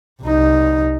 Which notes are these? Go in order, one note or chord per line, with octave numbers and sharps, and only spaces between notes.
C2 D#4